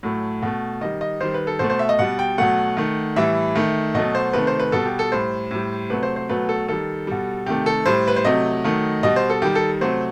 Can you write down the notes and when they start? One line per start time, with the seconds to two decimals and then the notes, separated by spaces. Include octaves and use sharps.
0.03 A2 F#3 A3
0.42 B2 A3
0.81 D#3 G3 D#5
1.01 D#5
1.21 D#3 G3 C5
1.34 B4
1.47 A4
1.59 B2 A3 C5
1.70 C5
1.79 E5
1.89 D#5
1.99 B2 G3 F#5
2.19 G5
2.38 B2 F#3 A3 F#5
2.77 D#3 A3
3.16 A2 E3 G3 E5
3.56 D#3 A3
3.94 B2 F#3 A3 D#5
4.15 C5
4.33 C3 D#3 A3 B4
4.47 C5
4.60 B4
4.72 B2 G3 A4
4.86 G4
4.99 A4
5.12 A2 G3 C5
5.51 A2 G3
5.90 C3 F#3 A3 B4
6.03 C5
6.16 C5
6.29 B2 F#3 A3 B4
6.49 A4
6.68 D#3 G3 A4
7.07 B2 G3
7.46 C3 D#3 A3 G4
7.66 A4
7.86 A2 G3 C5
8.08 B4
8.16 C5
8.25 C3 F#3 A3 D#5
8.64 D#3 F#3 A3
9.03 B2 G3 D#5
9.16 C5
9.30 A4
9.42 D#3 G3 G4
9.55 A4
9.81 C3 F#3 A3 C5